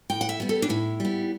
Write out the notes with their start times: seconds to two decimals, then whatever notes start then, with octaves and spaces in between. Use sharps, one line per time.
0.10 A2 G5
0.21 F#5
0.29 E5
0.40 G3 B3
0.49 A4
0.62 D4
0.69 A2 E4
1.00 G3 B3